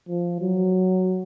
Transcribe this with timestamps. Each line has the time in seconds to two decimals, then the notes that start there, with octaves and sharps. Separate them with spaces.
0.09 F3
0.41 F#3